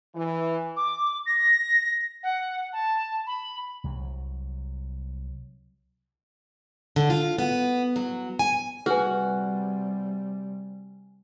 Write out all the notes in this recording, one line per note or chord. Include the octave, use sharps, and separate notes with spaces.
E3
D6
A#6
F#5
A5
B5
C2 F#3
D3
F4
B3
F#3
G#5
C3 G3 F#4 G#4 B4 G#5 F6